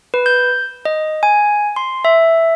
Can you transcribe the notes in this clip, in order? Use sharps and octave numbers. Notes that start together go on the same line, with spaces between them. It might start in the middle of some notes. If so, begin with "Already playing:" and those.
B4
G6
D#5
G#5
C6
E5